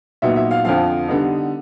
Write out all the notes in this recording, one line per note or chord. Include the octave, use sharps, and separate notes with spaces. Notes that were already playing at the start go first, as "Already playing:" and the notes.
A#2 F#3 B3 D#4 E5
E5
F5
F2 D3 F3 F5
D3 G3 B3 D#4